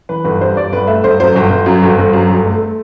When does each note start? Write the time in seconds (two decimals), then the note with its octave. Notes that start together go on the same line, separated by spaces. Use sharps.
0.09 E3 B4
0.25 G1 B4
0.41 G2 C5
0.56 G1 D5
0.72 G1 B4
0.87 A3 E5
1.04 G1 C5
1.20 F#2 C5
1.36 G1
1.50 G1
1.66 F#2
1.82 G1
1.99 G1
2.13 F#2
2.30 G1
2.45 A3
2.61 A3